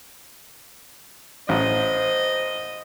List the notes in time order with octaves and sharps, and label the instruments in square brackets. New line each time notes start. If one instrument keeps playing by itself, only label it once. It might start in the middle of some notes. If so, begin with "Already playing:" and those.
[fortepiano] A1 [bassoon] C5 [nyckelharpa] D#5